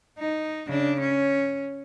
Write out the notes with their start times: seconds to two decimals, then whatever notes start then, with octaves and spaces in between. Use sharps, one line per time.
0.19 D#4
0.67 C#3 D4
1.01 C#4